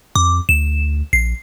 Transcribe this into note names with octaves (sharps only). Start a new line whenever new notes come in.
F2 D6
D2 E7
A#1 C7